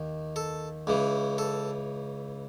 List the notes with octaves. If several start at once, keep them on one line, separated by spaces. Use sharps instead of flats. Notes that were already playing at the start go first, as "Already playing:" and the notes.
Already playing: D#2 D#3
A4
C#2 C#3 E3
A4